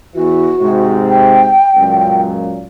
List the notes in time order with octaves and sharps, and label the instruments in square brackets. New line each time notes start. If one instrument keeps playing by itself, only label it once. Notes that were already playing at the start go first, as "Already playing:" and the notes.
[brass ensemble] E2 E3 [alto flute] F#4
[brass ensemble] G#2 C3
[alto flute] G5
[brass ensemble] C#2 F#2 A#2